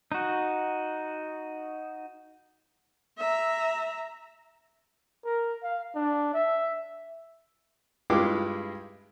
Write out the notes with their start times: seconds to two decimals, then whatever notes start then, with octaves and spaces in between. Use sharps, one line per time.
0.12 D#4 F#4
3.18 E5 A#5
5.25 A#4
5.63 F5
5.95 D4
6.33 E5
8.10 G2 G#3 E4 F4 G5 D6